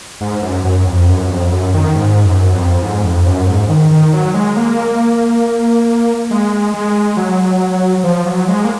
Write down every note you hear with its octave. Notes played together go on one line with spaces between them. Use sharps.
G#2
F#2
F#2
F2
F#2
F2
F#2
D#3
G#2
F#2
F2
G#2
F2
F#2
G#2
D#3
D#3
F#3
G#3
A#3
G#3
G#3
F#3
F3
F#3
G#3
A#3